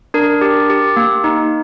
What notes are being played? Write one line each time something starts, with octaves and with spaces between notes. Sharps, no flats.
D4 A#4
G4
G4
A#3
D#4